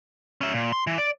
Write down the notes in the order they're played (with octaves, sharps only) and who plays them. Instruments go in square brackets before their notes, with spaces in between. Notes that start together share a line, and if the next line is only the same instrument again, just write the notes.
[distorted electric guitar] C#4 E5
A#2
C6
E3
D5